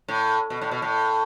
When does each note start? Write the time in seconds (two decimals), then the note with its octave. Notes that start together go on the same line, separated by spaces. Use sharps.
0.08 A2
0.50 B2
0.62 A2
0.71 B2
0.82 A2